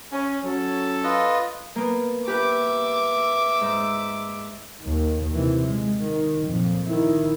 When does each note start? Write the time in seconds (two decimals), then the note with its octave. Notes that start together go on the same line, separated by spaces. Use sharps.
0.12 C#4
0.45 F#3 C#4 A4
1.04 F4 B4 D#5
1.76 A#3 B3
2.28 G4 B4 E5 D6
3.61 G#2
4.81 D#2 D#3
5.34 C3 E3
5.67 G#3
6.02 D#3
6.46 F2 A#2
6.86 D#3 E4